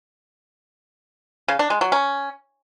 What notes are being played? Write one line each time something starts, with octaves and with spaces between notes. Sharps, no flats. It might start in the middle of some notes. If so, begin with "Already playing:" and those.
C#3
D4
G#3
F#3
C#4